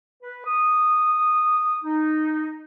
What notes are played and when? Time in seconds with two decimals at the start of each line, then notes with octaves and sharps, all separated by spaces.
0.23 B4
0.46 D#6
1.83 D#4